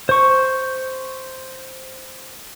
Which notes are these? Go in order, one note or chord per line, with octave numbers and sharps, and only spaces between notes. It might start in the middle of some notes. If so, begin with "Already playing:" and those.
C5 C#6